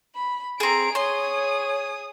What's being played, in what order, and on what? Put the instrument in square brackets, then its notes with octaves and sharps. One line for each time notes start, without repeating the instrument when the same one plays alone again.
[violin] B5
[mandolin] C4 G#4 [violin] A#5 D7
[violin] G#4 D#6 [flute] C#5 [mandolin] C6